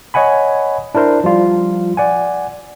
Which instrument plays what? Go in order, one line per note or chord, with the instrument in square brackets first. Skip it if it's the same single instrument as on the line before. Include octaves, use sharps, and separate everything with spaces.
[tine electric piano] C#5 D#5 F#5 G#5 B5
D4 E4 A#4 C5
F3 G3 F4
D5 F#5 G#5